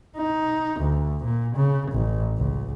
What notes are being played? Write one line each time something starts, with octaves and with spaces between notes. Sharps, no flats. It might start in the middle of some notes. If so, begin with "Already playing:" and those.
D#4
D2
A#2
C#3
A1
C#2